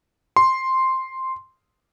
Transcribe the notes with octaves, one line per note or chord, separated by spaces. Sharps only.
C6